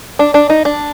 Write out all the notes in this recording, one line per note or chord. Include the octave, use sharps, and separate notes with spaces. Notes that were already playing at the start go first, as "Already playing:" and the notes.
D4
D4
D#4
D4